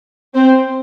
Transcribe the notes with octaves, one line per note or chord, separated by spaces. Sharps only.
C4 C5